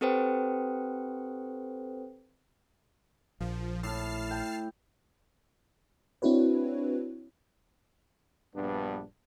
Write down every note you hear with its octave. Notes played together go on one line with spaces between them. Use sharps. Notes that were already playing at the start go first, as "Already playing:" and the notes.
C4 G4 A4 B4 C5 G5
A#1 F3
A2 A5 F6 C7
G5
C4 D4 E4 F#4 B4 C#5
A#1 G2 B3 D4